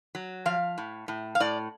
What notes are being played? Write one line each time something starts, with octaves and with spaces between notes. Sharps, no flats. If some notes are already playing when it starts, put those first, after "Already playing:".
F#3
F3 F5
A2
A2
F5
A2 D5